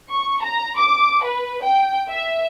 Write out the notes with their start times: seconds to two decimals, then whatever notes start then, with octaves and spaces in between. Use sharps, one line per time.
0.10 C#6
0.42 A#5
0.78 D6
1.23 B4
1.63 G5
2.09 E5